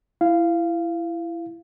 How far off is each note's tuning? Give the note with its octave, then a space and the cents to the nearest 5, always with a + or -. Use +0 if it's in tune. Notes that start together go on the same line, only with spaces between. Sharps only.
E4 +20 F5 -10